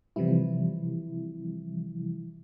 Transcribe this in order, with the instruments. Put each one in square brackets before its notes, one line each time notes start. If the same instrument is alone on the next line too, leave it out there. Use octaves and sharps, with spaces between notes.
[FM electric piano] C3 E3 F3 G3 E4